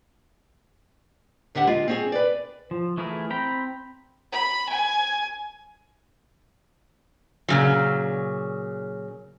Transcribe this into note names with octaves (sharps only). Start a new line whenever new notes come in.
D2 D3 G4 E5 F#5
G#3 F4
C4 C#4 G#4
B4 D5
F3
E3 A3 E4 G#4 A#4
C4 G5 A#5 B5
B5
G#5
A#2 C#3 F#3